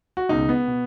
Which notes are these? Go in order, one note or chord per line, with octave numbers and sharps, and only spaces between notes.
F#4
C#2 B2 D#4
B3
B2